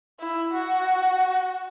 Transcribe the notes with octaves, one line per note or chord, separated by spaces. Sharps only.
E4
F#4